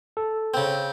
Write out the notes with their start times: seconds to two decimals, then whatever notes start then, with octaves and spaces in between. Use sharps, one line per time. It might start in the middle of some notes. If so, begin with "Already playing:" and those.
0.17 A4
0.54 C#3 C4